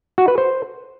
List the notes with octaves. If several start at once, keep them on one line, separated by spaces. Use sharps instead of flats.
F#4
B4
C5